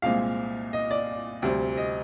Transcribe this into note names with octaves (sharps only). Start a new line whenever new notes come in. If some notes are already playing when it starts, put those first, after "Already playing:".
C2 A#2 G#3 C4 F5
D#5
D5
D2 C3 G3 C4
D#5